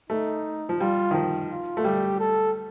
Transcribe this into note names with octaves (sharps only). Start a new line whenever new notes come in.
A3 D#4
F3
G3 F4
D#3
F3
F4
A3
G3 G4
A4